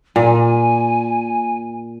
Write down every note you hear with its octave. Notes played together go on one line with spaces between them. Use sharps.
A#2 G#5